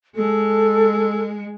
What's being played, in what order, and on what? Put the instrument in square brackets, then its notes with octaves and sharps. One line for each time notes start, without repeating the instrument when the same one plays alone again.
[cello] G#3 [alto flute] A4